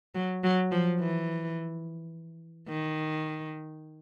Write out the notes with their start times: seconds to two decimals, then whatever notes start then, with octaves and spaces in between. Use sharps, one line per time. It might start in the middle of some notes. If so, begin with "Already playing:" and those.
0.15 F#3
0.44 F#3
0.72 F3
1.00 E3
2.68 D#3